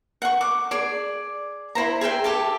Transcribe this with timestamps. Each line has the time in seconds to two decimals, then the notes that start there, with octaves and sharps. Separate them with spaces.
0.22 F#5 C#6
0.41 D6
0.71 G#4 D5
1.75 E4 C5 A#5
2.01 G#4 E5 G5 G#5
2.24 G4 A4 E5 A5